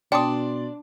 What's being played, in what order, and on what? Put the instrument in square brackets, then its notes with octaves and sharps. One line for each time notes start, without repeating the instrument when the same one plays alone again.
[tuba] B2 [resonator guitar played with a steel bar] D4 [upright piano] D5 C6 [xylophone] G5 D#6